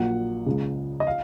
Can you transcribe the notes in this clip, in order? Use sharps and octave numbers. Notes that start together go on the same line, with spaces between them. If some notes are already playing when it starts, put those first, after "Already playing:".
Already playing: A#1 A#2 F#3 A#3 F#5
C#2 C#3 G#3
D#5
F5